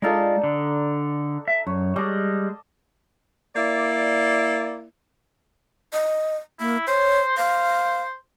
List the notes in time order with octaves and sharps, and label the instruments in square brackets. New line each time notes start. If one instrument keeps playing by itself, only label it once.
[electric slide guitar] G#3 F4 [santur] D4 D#4 A4
[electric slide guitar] D3
E5
[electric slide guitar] F#2 [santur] C#5
[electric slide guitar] G3 G#3 [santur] D#5 A5 D6
[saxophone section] A#3 E4 D5
[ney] D#5
[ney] A#3 [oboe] E4
[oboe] C5 [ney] C#5
[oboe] C5 [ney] F5